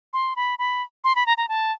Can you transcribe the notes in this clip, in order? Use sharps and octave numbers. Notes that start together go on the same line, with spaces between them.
C6
B5
B5
C6
B5
A#5
A#5
A5